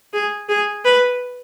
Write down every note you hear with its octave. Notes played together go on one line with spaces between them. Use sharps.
G#4
G#4
B4